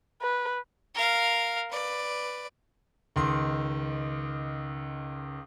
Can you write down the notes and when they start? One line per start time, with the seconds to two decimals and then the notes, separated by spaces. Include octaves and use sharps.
0.22 B4
0.95 A#4 F5
1.71 B4 D5
3.16 C#2 D#3 C6